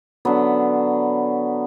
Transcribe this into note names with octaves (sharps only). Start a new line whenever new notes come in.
D3 F#3 B3